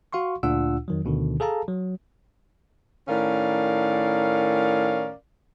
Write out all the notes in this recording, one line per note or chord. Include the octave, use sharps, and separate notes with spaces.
F#4 F5 C6 C#6
D2 A#2 D4 F4 F#5 E6
F2 D#3 F#3
D2 B2 D3 D#3
G#4 A4 F5 A5 A#5
F#3
A2 D#3 C#4 A#4 D5 F5